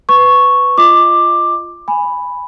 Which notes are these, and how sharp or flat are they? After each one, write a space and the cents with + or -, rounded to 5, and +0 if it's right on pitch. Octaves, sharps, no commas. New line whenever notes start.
B4 +15 C#6 +0
F4 -10 D#5 +0 D6 +10
G#5 -10 B5 +0